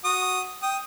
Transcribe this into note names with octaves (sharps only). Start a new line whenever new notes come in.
F#4 D#6
G5 D#6